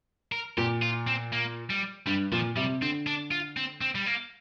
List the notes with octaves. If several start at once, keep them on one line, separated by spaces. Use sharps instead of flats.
A#4
A#2 G4
F4
C4
A#3
G3
G2 G3
A#2 F3
C3 G3
D3 C4
D4
F4
C4
C4
G3
A#3